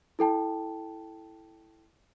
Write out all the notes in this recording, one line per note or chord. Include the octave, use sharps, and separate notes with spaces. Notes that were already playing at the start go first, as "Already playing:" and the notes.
E4 A4 G5 A5